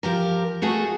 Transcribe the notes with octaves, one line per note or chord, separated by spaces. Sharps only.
F3 G4 A#4
A3 F#4 G#4 A4